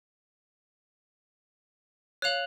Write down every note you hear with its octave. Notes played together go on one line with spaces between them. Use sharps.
C#5 F5 F#6 F7 F#7